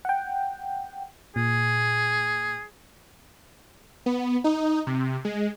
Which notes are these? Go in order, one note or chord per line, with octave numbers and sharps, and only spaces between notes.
F#5 G5
A#2 G#4
B3
D#4
C3
G#3